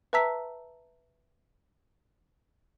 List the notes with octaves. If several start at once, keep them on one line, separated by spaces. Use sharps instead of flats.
B4 E5 A5 A#5 E6 B6